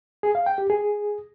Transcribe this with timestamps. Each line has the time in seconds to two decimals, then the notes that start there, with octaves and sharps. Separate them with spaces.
0.23 G#4
0.35 F5
0.46 G5
0.58 G4
0.70 G#4